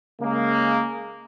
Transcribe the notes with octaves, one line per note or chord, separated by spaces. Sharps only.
C#3 G#3 A#3